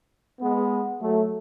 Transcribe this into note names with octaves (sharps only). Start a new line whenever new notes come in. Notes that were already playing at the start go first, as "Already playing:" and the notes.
G#3 B3
F#3 A3